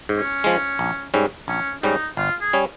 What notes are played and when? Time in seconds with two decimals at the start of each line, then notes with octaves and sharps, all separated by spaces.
0.09 G#2
0.17 C#4
0.44 F3 G#3
0.79 A#1
1.14 G#2 G3 C#4
1.48 A#1 C#4
1.83 G#2 G3 C#4 D#4
2.17 G1 F4
2.41 G#4
2.53 G3 C#4